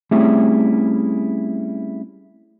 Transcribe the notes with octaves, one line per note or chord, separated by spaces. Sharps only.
G3 A3 C4 C#4 E4 G#4